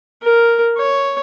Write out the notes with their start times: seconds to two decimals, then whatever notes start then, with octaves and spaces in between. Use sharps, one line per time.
0.22 A#4
0.78 C#5